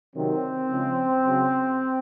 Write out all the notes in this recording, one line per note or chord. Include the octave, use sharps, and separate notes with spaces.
C3 D#3 F#3 C4
C#3 F3 G#3
C#3 F#3